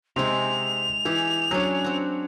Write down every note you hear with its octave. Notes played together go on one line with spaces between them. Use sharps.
C3 G#3 C4 D#4 F7
E3 G4 G#4
F#3 C#4 D4 C#5
C4 F#4